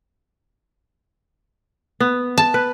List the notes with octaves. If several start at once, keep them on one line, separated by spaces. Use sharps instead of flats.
B3
A5
B4